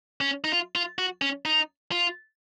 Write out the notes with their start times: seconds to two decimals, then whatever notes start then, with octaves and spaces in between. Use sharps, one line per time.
0.21 C#4
0.44 D#4
0.52 F4
0.75 F4
0.98 F#4
1.22 C#4
1.45 D#4
1.92 F4